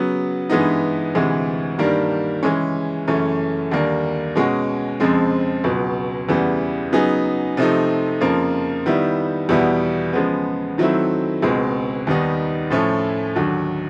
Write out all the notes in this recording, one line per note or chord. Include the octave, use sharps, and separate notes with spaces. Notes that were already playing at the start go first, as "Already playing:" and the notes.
Already playing: C#3 F#3 B3
G2 E3 G#3 B3 D#4
D2 C3 E3 G#3
G2 D#3 G3 A#3 D4
C#3 E3 G#3 C#4
F#2 C#3 E3 A3 C#4
D#2 D3 G3 A#3 D4
B2 G#3 C#4 F#4
F2 C#3 F3 G#3 C4
C#2 B2 F#3
E2 C#3 E3 G3 B3
C#3 F#3 B3 D#4 G#4
C3 F3 A3 C4 D#4
F2 C#3 F3 A#3
D#3 G3 B3 E4
E2 B2 G3 B3 E4
C#3 F3 G#3 B3
D#3 F#3 A3 C4 E4
C#2 B2 G#3 C4
D#2 D#3 G3 B3 D#4
A2 F3 A3 C#4
D#2 D3 F#3